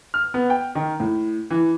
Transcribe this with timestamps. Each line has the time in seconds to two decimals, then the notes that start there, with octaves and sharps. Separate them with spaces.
0.14 F6
0.34 B3
0.50 G5
0.75 D#3
1.00 A2
1.51 E3